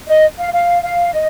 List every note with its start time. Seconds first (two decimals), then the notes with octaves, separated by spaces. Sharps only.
0.08 D#5
0.38 F5
0.53 F5
0.83 F5
1.13 D#5